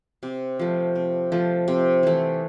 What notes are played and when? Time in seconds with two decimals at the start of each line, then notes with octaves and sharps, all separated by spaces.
0.23 C3
0.59 F3 A3
0.95 C3
1.32 F3 A3
1.68 C3
2.03 E3 A3